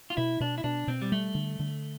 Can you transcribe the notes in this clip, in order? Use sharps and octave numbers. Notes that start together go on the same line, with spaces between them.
F4
B2 E4
B2 D4
E4
B2 D4
B2 C4
G3
G3 A3
D3
D3